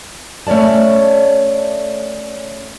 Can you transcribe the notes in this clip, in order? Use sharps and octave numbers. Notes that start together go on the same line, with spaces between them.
A3 C#4 C#5 D5 A5